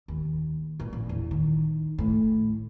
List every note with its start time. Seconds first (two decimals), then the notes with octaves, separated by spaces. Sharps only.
0.08 D#2
0.80 A#2
0.93 A#1
1.09 E2
1.31 D#3
1.98 A2